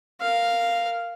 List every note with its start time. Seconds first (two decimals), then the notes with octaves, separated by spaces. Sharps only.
0.21 A#4 F5